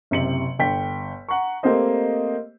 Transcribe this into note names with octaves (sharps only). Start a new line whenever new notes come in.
F#1 C3 C#7 F#7
G1 G5 B6
F#5 A#5 C#6
A3 A#3 C4 G4 C5 D#5